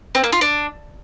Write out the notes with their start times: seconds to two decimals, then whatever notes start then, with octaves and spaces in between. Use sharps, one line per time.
0.15 C4
0.24 A#3
0.32 F4
0.41 D4